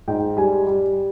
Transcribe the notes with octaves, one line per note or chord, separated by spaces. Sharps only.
G#2 G5
G3 G#5
G3